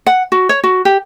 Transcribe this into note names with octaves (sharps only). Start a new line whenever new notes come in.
F#5
F#4
C#5
F#4
G4